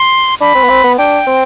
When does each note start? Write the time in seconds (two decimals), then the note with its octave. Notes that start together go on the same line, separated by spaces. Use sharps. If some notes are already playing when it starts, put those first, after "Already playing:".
Already playing: C6
0.41 D4 B5
0.55 C4
0.63 B3
0.69 C4
0.84 B3
0.98 D4 G5
1.27 C4